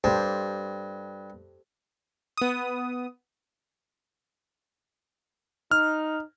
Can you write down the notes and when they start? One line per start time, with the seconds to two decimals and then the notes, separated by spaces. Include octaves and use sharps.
0.04 G2 G4 A4 C5
2.37 B3 D#6
5.71 D#4 F6